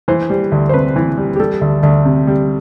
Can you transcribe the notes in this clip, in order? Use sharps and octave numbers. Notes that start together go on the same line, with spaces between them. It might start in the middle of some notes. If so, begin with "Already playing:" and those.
E3 C5
G3
D2
C5
C3 B4
E3
G3
G4
G3 A4
D2
D2
C3
G3